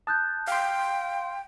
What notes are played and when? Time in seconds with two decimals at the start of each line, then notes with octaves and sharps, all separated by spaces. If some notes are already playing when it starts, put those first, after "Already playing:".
0.07 A5 D#6 F#6 G6
0.48 F5 G5 C6